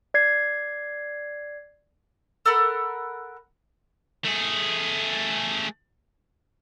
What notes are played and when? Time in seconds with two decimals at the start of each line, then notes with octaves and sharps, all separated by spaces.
0.14 D5 G#6 C7
2.46 A4 A#4 F#5 B5
4.24 A3 G#4